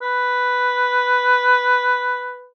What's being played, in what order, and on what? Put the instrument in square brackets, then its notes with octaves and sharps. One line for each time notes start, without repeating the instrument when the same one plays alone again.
[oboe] B4